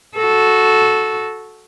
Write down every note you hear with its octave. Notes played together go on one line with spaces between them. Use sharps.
F#4 A4